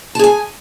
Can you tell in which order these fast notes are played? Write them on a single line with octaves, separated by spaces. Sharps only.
A5 G#4 G#5